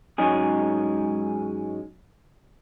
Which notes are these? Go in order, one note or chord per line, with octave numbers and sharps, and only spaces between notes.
G#2 F#3 G#3 C#4 D#4 G#4